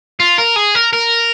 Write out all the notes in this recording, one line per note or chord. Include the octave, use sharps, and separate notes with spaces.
F4
A#4
G#4
A#4
A#4